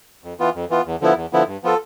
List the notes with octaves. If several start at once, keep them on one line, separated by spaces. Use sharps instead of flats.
F2
E3 B3 F4
F2
E3 B3 F4
E2
D3 F3 B3 E4
E2
D3 F3 B3 E4
G2
F3 B3 F4 A4